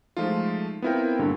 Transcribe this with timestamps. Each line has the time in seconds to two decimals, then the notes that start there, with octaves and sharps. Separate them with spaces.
0.17 F3 G#3 A3 D#4 F4
0.82 B3 C4 E4 F4 A#4 G5
1.19 G2 A#2 D3